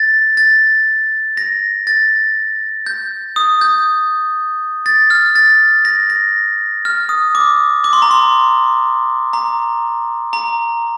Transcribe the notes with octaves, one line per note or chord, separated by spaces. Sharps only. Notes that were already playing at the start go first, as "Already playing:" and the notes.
Already playing: A6
A6
A#6
A6
G6
D#6
G6
A6
F6
A6
A#6
A#6
F6
D#6
D6
D6
C6
A#5
C6
A#5
A#5